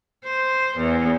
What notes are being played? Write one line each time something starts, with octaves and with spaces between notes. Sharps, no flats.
C5
E2